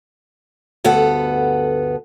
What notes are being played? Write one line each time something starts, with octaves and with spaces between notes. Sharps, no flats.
D2 G2 B3 A4 F#5